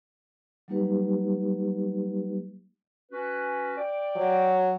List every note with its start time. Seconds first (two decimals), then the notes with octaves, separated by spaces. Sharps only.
0.68 F#3 G3 A#3 D#4 G4 B4
3.12 C#4 F#4 B4
3.77 D5 G5
4.16 F#3